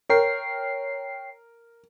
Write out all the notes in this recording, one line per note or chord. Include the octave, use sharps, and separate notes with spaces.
A#4 C#5 G5 C7